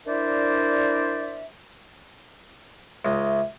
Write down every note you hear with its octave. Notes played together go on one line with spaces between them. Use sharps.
D4 E4 A#4 C5 D5 E5
C#2 D#5 E5